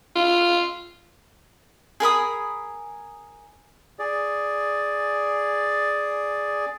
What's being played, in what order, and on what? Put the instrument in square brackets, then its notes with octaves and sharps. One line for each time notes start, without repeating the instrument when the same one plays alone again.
[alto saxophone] F4
[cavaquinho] G#4 A#4 B5 D#6
[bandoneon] G#4 D5